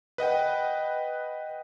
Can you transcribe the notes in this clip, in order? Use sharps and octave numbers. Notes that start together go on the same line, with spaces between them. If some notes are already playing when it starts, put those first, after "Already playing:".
B4 D#5 F#5 G5